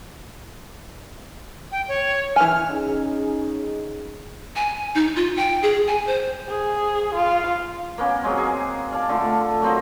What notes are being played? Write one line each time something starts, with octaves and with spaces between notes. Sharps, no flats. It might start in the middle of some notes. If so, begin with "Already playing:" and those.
G5
C#5
E3 G#5 F6
C#4 D#4 G#4
G#5
D#4
F4
G5
G#4
G#5
C5
G#4
F4
A#3 B3 C#4
F#3 G#3 C4
G#4
D5 F5 A5
D3 A3 F4
F#3 A#3 C4 D#5